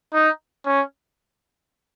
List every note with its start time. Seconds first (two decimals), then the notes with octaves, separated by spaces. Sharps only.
0.13 D#4
0.66 C#4